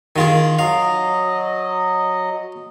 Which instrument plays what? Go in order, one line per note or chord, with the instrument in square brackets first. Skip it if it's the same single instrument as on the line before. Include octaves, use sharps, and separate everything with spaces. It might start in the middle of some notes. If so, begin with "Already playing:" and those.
[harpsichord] D#3 F4 G#4
[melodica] F#3 D#5 [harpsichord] F5